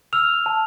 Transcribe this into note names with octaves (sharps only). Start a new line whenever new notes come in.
E6 F6 F7
A5